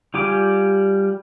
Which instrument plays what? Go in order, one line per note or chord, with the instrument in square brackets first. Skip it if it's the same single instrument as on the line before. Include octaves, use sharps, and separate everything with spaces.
[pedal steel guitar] G3 F4 G4 G#5 D6